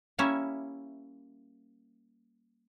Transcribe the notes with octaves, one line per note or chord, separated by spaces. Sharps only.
G3 A#3 C#4 E4 C#5 E5